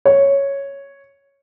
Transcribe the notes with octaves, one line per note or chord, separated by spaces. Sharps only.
C#5